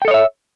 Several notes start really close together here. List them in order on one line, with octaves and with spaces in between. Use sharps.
G5 A4 D#5 C#5 E5